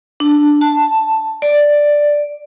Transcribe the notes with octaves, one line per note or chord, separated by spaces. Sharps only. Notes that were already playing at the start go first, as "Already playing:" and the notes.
D4
A5
D5